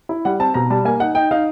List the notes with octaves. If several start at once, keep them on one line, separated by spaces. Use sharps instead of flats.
E4
G3 F#5
C4 A5
B2 A#5
G3 A5
A#3 G#5
D#4 F#5
D#4 G5
D#4 F5